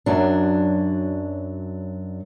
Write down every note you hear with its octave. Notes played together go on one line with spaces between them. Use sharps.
F#2 F#3 D4